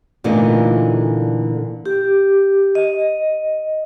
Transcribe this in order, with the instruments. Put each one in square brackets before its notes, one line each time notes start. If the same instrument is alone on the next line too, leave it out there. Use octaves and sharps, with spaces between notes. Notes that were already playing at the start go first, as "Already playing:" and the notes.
[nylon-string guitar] A#2 D3 E3 A3 A#3 D#4
[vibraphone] G4
D#5